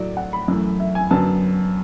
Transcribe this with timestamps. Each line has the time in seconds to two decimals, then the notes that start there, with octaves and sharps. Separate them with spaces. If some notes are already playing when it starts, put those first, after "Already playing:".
Already playing: A2 F#3 A3 D5
0.17 F#5
0.33 B5
0.48 F#2 E3 A3
0.80 E5
0.95 G#5
1.11 F#2 D3 F#3 B3 A5